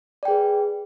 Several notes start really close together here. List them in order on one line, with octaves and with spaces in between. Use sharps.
D5 G5 G#4 B4